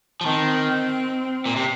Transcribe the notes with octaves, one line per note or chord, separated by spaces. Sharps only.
F3
D#3 C4
A#2
C3